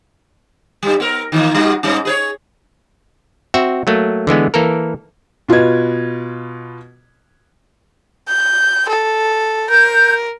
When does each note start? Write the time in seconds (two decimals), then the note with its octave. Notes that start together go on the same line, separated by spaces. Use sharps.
0.83 G2 G3
1.00 B3 A#4
1.32 D#3 E3 A#3
1.55 G3 D#4 F#4
1.83 G#2 G3 C#4
2.05 G#4 B4 C#5
3.54 C4 F#4 E5
3.87 F#3 A3 A#3
4.27 D3 E3 G#3 B3
4.54 E3 A#3 A4 A#4
5.49 B2 F4 B4 D#5 G#6
8.28 G6
8.89 A4
9.70 A#4 G6